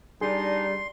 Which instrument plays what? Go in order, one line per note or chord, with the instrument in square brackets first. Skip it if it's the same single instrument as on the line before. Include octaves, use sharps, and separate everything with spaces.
[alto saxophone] G3 [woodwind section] D4 D#4 [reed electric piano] G#4 [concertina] C6